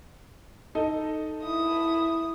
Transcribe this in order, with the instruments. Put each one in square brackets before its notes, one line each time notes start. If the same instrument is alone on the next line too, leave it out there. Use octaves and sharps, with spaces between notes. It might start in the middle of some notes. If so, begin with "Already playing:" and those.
[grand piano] D#4 A4 D#5
[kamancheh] E4 D#6